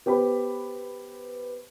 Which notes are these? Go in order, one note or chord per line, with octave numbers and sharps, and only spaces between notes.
B3 G4 C5 B5